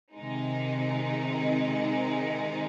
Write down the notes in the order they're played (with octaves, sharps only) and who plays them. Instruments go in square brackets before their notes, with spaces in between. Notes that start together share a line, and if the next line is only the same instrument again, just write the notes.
[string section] C3 D#3 G#3 D#4